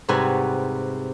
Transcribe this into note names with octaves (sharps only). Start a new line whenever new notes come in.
G#2 C3 G3 F#4 B4 G#5